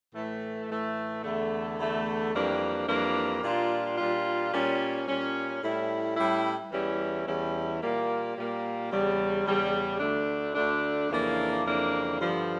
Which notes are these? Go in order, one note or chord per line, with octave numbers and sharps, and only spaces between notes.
A2 E3 A3
A2 E3 A3
E2 D3 A3
E2 D3 A3
F2 E3 G3 A#3 D4
F2 E3 G3 A#3 D4
A#2 G3 D4 F4
A#2 G3 D4 F4
A#2 G3 C#4
A#2 G3 C#4
A2 G3 C#4 E4
A2 G3 C#4 E4
E2 E3 G3 C#4 E4
E2 E3 G3 C#4 E4
A#2 G3 A#3
A#2 G3 A#3
E2 C#3 G3
E2 C#3 G3
D2 D3 A3 D4
D2 D3 A3 D4
F2 C#3 E3 A#3 D4
F2 C#3 E3 A#3 D4
G2 D3 F3